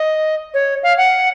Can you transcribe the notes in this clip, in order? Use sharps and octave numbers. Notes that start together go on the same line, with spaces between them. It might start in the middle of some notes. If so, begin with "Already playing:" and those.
Already playing: D#5
C#5
F5
F#5